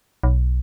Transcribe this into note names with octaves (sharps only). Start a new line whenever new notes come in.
B1